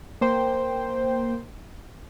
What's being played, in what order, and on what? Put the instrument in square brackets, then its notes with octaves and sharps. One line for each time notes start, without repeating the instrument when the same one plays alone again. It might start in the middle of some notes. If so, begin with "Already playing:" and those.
[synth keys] A#3 C5 G5